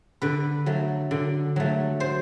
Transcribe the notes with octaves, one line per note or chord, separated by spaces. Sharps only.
D3 B4
F#3 A3
D3
F#3 A3
C5